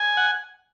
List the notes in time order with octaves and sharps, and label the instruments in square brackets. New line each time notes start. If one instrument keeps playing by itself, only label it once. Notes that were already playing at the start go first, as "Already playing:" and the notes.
Already playing: [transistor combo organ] G#5
F#5